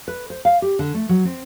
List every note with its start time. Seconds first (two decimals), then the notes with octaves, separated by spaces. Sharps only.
0.08 B4
0.30 C5
0.45 F5
0.62 G4
0.79 D3
0.95 A3
1.09 F#3
1.25 C4